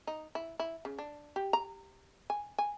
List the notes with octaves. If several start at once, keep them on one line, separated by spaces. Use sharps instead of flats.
D#4
E4
E4
C#3
D4
G4
A#5
G#5
G#5